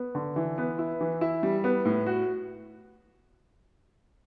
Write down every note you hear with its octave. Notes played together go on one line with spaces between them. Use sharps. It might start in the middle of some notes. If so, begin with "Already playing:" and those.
Already playing: B3
D3
E3
B3
E4
E3
E4
G3
B3
A2
F#4